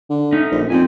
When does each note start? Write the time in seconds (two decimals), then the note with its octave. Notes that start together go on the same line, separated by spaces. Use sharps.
0.10 D3
0.32 A3 C#4 D#4
0.51 A#1
0.70 F2 C4 G#5